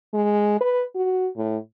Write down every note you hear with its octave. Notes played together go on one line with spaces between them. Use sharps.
G#3
B4
F#4
A2